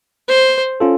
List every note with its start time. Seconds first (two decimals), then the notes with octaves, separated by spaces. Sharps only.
0.28 C5
0.80 C#4 F4 A4